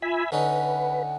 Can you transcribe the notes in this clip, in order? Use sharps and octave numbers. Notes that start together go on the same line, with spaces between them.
F4 E5 G#5 B5
D3 C#4 D#4 B4 F#5